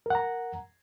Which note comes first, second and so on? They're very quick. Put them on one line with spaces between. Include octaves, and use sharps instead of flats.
A#4 F#5 A#5